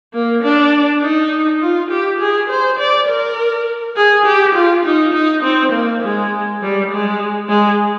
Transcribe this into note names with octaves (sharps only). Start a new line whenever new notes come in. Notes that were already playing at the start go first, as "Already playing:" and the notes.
A#3
D4
D#4
F4
G4
G#4
C5
D5
A#4
G#4
G4
F4
D#4
D#4
C4
A#3
G#3
G3
G#3
G#3